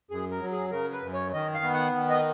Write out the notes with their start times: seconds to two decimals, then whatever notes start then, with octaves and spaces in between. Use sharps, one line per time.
0.10 F#2 G#4
0.31 A#4
0.41 F#3
0.52 G#4
0.71 C#3 A#4
0.92 B4
1.02 F#2
1.13 C#5
1.33 D#3 D#5
1.54 F5
1.64 B3
1.74 F#5
1.96 D#3
2.10 D#5